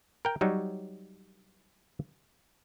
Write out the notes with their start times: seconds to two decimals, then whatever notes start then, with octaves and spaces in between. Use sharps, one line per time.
0.25 A#4 G5
0.41 F#3 G3 D#4 C#5